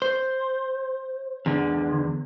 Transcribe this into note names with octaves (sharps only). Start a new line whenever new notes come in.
C5
E2 D3